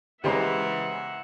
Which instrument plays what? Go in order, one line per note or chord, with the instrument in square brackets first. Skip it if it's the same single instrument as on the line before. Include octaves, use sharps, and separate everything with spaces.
[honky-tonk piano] C#3 G#3 [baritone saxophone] E3 [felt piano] G4 C5 A#5 [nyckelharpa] E5 F#5